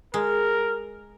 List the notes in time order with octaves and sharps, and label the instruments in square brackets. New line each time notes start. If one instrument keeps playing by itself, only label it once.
[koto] G#3 [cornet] A#4